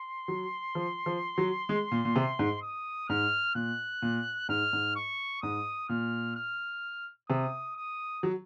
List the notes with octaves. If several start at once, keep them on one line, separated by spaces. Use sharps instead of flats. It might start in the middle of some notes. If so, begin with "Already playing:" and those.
Already playing: C6
F#3
F3
F3
F#3
G#3
A#2
A#2
C3
G#2
D#6
G#2 F6
A#2 F#6
A#2
G#2 F6
G#2
C#6
G#2 D#6
A#2 F6
F6
C3 D#6
D#6
F#3